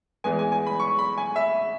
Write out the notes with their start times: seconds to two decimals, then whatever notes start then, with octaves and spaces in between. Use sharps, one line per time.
0.24 E2 E3 G#3 B3 G#5
0.39 G#5
0.52 G#5
0.67 B5
0.80 C#6
0.99 B5
1.18 G#5
1.36 E5